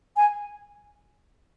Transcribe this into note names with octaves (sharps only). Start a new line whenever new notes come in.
G#5